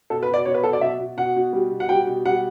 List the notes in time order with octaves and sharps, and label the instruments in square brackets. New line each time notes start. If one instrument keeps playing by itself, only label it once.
[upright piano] B2 A4
B4
B2
D5
B2 C#5
B4
F#3 A4
D5
B2 E5
B2
B2 F#5
B2
G3
B2
F#5
G3 G5
B2
G3 F#5